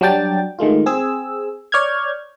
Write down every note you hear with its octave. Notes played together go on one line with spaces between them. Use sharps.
F#3 G3 D4 G5 A6
D#3 G#3 A3 F4
C4 G#4 E6
C#5 D5 F6 G6 G#6